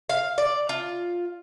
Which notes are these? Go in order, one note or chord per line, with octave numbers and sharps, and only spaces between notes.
F5
D5
F4